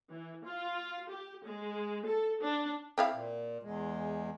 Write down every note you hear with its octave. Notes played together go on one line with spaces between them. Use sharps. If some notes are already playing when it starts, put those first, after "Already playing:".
E3
F4
G4
G#3
A4
D4
C4 E4 F5
A#2
E2 G#3